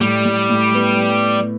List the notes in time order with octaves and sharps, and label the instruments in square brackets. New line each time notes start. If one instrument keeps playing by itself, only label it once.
[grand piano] A2 [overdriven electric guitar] G3
[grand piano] A2
A2
B3